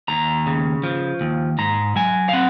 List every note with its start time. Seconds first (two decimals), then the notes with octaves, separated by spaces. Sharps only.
0.08 D#2 A#5
0.46 C#3
0.83 F3
1.21 D#2
1.59 G#2 A#5
1.96 F#3 G#5
2.29 F5
2.33 C4 F#5